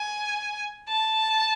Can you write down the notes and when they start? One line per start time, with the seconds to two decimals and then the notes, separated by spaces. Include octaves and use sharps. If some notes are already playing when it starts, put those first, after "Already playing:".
Already playing: G#5
0.89 A5